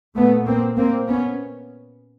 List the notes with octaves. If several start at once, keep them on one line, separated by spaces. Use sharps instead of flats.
A#2 A3 B3
A#3 C4
A#2 A#3 C4
B3 C#4